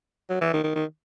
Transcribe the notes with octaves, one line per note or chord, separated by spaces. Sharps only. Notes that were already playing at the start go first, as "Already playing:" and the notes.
F#3
E3
D#3
D#3
D#3